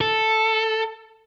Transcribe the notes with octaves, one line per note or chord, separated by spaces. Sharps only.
A4